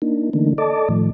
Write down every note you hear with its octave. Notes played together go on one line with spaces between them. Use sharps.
A#3 D4 D#4
D3 E3 A3 A#3 D4 D#4
A4 D5 D#5 A5 D6
A2 D#3 F3 A3